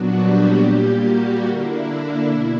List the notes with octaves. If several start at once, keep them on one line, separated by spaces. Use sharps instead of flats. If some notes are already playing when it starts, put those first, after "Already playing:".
Already playing: A#2 F#3 B3 D4 F#4
G3 G4
A#2 G3 A#3
F#4
D3 A#3 D4 E4
B2